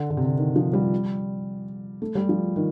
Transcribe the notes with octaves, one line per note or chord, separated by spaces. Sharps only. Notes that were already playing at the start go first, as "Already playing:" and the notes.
Already playing: D3
D3
C3
D3
D#3
F3
G3
A3
G3
F3
D#3